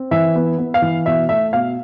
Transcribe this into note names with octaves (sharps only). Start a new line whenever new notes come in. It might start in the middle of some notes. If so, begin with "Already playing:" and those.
Already playing: C4
E3 E5
B3
B3
F5
E3
B2 E5
A3 E5
B2 F5